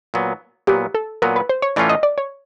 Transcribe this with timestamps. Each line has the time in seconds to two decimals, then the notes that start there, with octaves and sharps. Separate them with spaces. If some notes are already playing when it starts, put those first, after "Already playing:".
0.14 A#2 F#3 B3
0.67 A#2 F#3 B3 G4
0.94 A4
1.22 A#2 F#3 B3 A#4
1.36 B4
1.49 C5
1.62 C#5
1.76 A2 E3 A3 C#4 F4 D5
1.89 D#5
2.03 D5
2.18 C#5